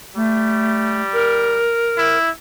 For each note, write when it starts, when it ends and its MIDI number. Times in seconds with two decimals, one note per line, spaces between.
0.16 1.62 55
0.16 1.01 57
1.13 2.17 70
1.98 2.29 64